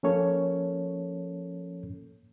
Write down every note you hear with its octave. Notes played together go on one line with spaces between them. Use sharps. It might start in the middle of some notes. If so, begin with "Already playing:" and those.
F3 A#3 C#4 A4 C#5